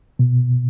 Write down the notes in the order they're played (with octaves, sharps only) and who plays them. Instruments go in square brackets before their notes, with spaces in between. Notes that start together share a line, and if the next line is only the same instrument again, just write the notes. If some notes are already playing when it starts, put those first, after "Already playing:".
[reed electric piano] B2